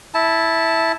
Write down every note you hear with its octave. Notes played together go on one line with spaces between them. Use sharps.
E4 A5